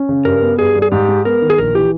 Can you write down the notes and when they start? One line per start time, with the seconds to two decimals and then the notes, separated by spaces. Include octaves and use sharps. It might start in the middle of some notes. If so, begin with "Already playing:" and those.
Already playing: C#4
0.09 C#3
0.25 G2 A#4
0.42 B3
0.59 G2 G#4
0.75 G3
0.82 G#4
0.92 G#2 G4
1.08 G#3
1.25 B3 A#4
1.42 D#3
1.50 G#4
1.58 A#1 A#4
1.75 E3 G4